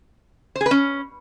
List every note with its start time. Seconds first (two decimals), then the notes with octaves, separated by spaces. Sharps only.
0.56 C5
0.61 G#4
0.66 B4
0.71 C#4